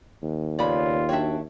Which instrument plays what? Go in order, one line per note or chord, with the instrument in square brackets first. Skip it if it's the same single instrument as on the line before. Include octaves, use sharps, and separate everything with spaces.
[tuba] D#2
[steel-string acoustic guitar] C#3 B3 C#5 [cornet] F4 [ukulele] D5 B5
[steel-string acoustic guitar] D4 F#4 G5 [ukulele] C#5 E5